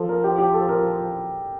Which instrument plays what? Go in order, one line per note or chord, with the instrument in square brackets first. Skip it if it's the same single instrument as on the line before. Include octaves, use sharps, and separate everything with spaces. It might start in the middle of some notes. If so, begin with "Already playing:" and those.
Already playing: [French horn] F3 [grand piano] A4
[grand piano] A#4
G4
G4
A4
A#4